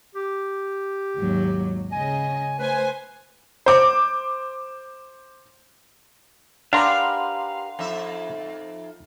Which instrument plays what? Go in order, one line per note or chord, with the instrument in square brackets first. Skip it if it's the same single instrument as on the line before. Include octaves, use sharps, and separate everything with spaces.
[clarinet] G4
[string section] G#1 D#2 F#3
[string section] C#3 D#5 [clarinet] G#5
[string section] A3 C5 G#5 [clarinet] B4
[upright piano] C5 D6
[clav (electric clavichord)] D4 A#5 [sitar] G4 A#4 B4 [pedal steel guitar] F5 [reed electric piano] F#5 C6
[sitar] F2 D#4 E5